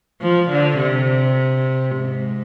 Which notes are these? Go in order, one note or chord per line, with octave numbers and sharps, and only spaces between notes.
F3
D3
C3
G#2